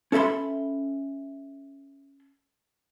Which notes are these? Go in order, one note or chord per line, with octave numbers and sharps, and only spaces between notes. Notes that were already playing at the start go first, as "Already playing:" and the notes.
C#4 A4 E5 B5 C6